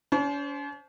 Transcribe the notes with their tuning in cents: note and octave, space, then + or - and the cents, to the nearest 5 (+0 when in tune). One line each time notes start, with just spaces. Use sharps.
C#4 +45 C5 +0